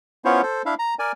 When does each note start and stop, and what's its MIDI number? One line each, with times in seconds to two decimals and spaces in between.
0.25 0.42 59
0.25 0.42 61
0.25 0.42 64
0.25 0.42 65
0.25 0.42 72
0.25 0.42 73
0.43 0.62 69
0.43 0.62 72
0.66 0.74 62
0.66 0.74 64
0.66 0.74 76
0.66 0.74 77
0.79 0.94 82
0.99 1.12 70
0.99 1.12 74
0.99 1.12 80